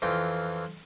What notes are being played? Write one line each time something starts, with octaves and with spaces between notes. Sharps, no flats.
F2 E3 F4 G5